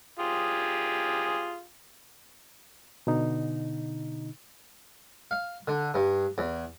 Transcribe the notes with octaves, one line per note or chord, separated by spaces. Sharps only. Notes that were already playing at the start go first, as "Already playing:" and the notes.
F4 G4 G#4
B2 D3 D#4
F5
D3
G2
E2